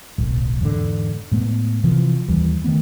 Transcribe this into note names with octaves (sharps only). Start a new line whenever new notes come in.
D1 B1
E2 G#2 B2 D3
A2 G#3 B3
C3 E3 F3
D#2 E3 G3
D#3 F#3 A3 B3